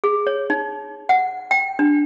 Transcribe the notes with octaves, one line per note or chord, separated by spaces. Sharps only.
G#4
C#5
D#4
F#5
G5
D4